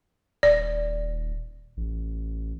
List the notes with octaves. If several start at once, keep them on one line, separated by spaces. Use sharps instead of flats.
D#1 D5
A1